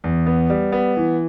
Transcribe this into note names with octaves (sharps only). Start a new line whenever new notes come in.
E2
B3
G3
B3
E3